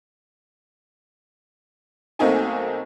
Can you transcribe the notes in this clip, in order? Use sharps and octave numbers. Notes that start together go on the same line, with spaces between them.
B1 A3 A#3 C4 D#4 G#5